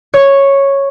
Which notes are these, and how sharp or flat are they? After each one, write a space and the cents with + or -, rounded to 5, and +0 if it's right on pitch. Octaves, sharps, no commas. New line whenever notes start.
C#5 -5